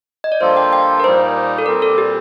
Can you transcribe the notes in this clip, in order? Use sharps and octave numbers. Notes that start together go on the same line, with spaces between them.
D#5
D5
G2 F3 A#3 F4 A4 C5
G5
G5
A#4
A#2 G3 A#3 D#4 C5
A4
A#2 G3 C4 A#4
A4
G4